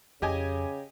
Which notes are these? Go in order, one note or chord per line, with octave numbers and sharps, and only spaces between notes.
F2 C#3 G4 D#5 G#5